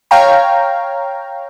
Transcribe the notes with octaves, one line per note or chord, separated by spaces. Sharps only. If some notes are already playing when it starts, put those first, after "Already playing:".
C#5 F5 G5 A#5